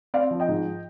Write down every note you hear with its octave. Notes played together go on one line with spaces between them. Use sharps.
C4 D5 F5
F3
D#5 G5
G#2